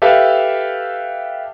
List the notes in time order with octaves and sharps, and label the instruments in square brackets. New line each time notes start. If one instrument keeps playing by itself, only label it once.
[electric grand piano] G4 A4 B4 E5 F5